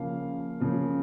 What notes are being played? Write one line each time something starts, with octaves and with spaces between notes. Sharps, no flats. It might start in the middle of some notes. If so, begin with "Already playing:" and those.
Already playing: C#3 F3 A#3 F5
C#3 F3 A#3